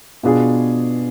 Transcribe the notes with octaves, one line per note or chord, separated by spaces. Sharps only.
B2 B3 D4 F4 G#4